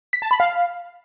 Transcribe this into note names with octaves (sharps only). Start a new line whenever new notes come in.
B6
A5
B5
F5